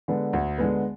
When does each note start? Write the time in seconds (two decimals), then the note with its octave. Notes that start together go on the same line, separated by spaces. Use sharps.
0.08 D3 G#3 B3
0.33 D2
0.58 D3 G#3 B3